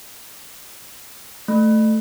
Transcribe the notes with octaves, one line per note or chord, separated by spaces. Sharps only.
A3